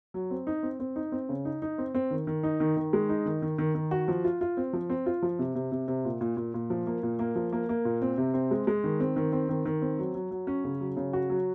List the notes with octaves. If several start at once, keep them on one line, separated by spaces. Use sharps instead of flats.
F#3
C4
D#4
C4
C4
D#4
C4
C#3
D#4
D#4
C4
C4
D#3
D#3
D#4
D#3
D#3
G#3
D#4
D#3
D#3
D#3
D#3
F#4
F3
F4
F4
C4
F3
C4
F4
F3
C3
C3
C3
C3
A#2
A#2
A#2
A#2
F3
A#3
A#2
A#3
F3
A#3
A#3
A#2
C4
C3
C4
G#3
G#3
D#3
C4
D#3
C4
D#3
D#3
C4
F#3
F#3
F#3
C#4
C#3
F#3
C#3
F#4
F#3